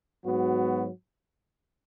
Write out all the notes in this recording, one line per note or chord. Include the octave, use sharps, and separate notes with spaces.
G#2 F#3 B3 F#4